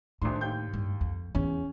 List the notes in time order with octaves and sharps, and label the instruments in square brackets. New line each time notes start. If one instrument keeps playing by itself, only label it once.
[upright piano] D#1 D4 C6 [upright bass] A2
[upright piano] D#2 G5 G6
[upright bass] G2
F2
[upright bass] E2 [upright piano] C#4